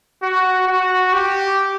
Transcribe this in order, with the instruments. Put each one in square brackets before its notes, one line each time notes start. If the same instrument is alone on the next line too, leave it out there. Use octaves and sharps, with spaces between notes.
[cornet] F#4
F#4
G4